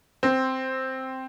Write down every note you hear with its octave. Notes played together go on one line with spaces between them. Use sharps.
C4